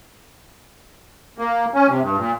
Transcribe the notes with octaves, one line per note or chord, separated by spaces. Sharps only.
A#3
C#4
C3
G2
A#2